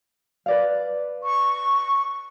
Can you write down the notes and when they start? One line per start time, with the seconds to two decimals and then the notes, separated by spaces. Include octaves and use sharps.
0.46 B4 D5 F5
1.23 C#6